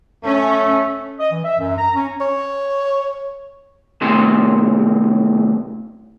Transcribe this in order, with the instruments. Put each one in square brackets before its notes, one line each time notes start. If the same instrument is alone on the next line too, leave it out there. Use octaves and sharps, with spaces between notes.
[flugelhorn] A3 [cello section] C#4
[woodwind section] D#5
E3
E5
F#2
A#5
C#4
[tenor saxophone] C#5
[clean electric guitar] D#2 A2 C3 A5 C6